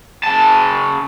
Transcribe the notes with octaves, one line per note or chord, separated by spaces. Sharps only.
C#3 A5